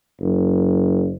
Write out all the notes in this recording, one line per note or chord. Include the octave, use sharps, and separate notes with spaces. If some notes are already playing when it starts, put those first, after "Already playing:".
F#1